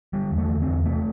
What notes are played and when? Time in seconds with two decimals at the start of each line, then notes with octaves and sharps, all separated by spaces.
0.13 D3 G3
0.31 E2
0.38 A3
0.49 D3
0.62 C4
0.67 E2
0.86 C3 A3